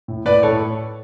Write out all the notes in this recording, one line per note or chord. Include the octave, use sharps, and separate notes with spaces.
A2
A2 B4 D5
A2 A4 C#5